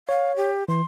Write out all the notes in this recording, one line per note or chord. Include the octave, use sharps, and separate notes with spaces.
C#5 F5
G4
E3 C6